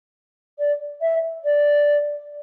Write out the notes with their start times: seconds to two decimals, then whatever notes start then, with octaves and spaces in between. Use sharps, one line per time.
0.58 D5
1.01 E5
1.44 D5